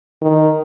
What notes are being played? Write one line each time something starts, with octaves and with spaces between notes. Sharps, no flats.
D#3